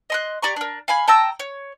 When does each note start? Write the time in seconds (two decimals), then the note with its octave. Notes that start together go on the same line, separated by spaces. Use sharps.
0.10 D#5 C6 F#6
0.42 G4 D5 A#5 C#6
0.56 D4 A#4
0.88 F5 G#5 B5
1.08 G5 A5 A#5 E6
1.39 C#5